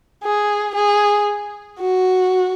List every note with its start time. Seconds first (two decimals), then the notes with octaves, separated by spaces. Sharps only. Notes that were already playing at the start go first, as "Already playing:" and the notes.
0.23 G#4
0.75 G#4
1.80 F#4